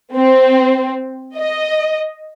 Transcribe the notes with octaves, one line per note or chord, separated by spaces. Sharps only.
C4
D#5